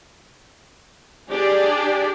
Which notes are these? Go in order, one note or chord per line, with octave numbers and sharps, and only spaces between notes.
D4 G4 G#4 D5